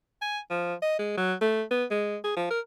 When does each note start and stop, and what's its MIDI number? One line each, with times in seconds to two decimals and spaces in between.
0.22 0.39 80
0.50 0.74 53
0.82 0.96 75
0.99 1.15 56
1.17 1.34 54
1.41 1.63 57
1.71 1.85 59
1.91 2.17 56
2.24 2.36 68
2.37 2.48 53
2.50 2.60 70